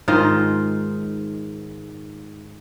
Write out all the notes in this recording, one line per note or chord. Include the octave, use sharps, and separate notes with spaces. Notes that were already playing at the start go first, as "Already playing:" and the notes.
G#2 D#3 F4 D#5